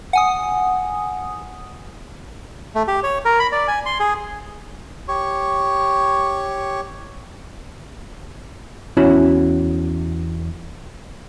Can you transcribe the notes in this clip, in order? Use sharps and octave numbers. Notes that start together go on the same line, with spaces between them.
F#5 G#5 D#6
A3
G4
C#5
A#4
B5
D5
G#5
C6
G#4
G4 C#5 C#6
E2 C#4 E4 F#4 B5